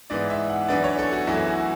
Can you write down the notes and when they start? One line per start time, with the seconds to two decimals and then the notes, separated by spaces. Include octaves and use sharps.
0.10 G#2 E3 B3 D5
0.30 E5
0.50 F#5
0.68 F#2 E3 B3 D4 D5
0.84 C#5
0.99 A4
1.12 F#4
1.27 F#2 E3 A3 E4
1.47 F#4